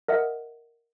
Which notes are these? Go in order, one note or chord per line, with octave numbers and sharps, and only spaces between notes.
A#4 D#5 E5 F#5